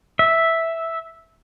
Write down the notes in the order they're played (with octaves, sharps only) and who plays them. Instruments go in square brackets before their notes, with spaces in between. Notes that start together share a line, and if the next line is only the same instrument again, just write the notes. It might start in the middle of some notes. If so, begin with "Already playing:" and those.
[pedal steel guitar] E5